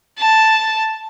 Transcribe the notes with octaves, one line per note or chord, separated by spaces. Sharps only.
A5